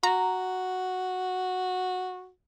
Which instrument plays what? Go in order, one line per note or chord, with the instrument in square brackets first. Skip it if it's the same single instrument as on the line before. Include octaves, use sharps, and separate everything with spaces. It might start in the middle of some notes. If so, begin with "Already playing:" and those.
[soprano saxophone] F#4 [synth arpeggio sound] A#5